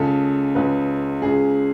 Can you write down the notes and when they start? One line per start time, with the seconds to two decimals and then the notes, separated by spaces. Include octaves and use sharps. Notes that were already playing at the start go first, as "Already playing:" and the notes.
Already playing: C#2 C#3 A4
0.55 C#2 C#3 B4
1.22 C#2 C#3 G#4